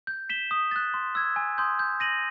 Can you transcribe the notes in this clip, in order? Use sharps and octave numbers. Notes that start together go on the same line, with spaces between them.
G6
B6 E7 G7
D#6
F#6 A6
C6
E6 G#6
G#5
C6 D#6 G6
G6
A#6 D#7 F#7